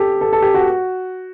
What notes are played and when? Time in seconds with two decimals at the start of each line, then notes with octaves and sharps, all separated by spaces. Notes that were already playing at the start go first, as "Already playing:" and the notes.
Already playing: G4 A4
0.21 A4
0.32 A4
0.42 G4
0.54 F#4